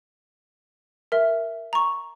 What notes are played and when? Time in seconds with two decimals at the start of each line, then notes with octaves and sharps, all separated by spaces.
1.12 A#4 E5
1.73 A#5 C#6